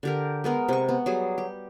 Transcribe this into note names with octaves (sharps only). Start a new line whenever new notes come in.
D3 G4 A#4
G#3 B3 A#4
C3 C#6
B3
F#3 G3 G#4
G4